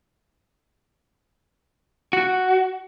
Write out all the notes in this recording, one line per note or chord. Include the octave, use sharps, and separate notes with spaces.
F#4